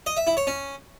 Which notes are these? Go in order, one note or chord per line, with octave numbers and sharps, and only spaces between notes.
D#5
E5
E4
C#5
C#4